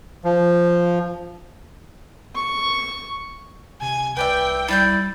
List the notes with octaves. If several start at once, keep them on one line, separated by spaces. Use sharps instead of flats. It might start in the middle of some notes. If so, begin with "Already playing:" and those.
F3
C#6
C3 G#5
C2 B4 D5 E5 G5
G3 E4 D5 G6